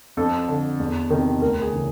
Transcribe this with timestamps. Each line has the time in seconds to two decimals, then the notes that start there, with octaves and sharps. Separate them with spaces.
0.17 F2 A4
0.48 D3
0.80 E2
1.10 C3 D#3
1.41 D2 A#4
1.62 G#4
1.73 C#3 E3